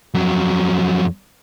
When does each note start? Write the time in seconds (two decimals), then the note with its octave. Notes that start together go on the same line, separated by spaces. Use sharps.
0.14 F2 F#3